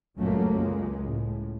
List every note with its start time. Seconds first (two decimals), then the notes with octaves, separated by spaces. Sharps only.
0.18 C#2 F#2 A#2 F#3 A3 A#3
0.52 C#2 G#3
1.05 A2